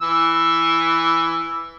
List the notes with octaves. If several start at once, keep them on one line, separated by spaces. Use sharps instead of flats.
E3 E6